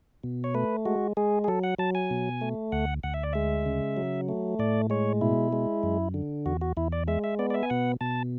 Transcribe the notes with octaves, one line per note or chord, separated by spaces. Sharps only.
B2
C#5
A3 B4
G#3 F#4
G#3 G#4
G#4
F#3 A4
F#5
F#3 A5
G#5
B2
A3
D2 F#5
D2 F#5
E5
D5
G#3 E5
C#3
F#3
A3
A2 D5
G#3 C#5
B2 E4
G#3
F#2
D3
E2 F#4
F#4
E2 E4
D5
G#3 E5
E5
B3 D5
D5
E5
G#5
B2 F#5
B2 A5